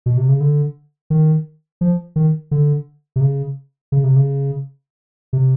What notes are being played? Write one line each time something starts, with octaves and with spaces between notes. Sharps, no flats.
B2
C3
C#3
D3
D#3
F3
D#3
D3
C3
C#3
C#3
C3
C#3
C3